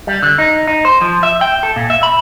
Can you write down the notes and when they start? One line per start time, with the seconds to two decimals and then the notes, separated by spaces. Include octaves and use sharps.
0.07 G3
0.23 D3
0.38 D#4
0.67 D#4
0.85 C5
1.02 F3
1.23 E5
1.41 G5
1.63 A4
1.76 A#2
1.90 E5
2.03 B5